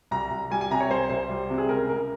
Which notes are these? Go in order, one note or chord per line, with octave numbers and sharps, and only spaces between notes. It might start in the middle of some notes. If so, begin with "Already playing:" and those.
C2 A#5
C2
G3 G#5
G#5
C3 A#5
C#5
C2 C5
C2 C5
G3
C3
G#4
C#2 A#4
C#2 A#4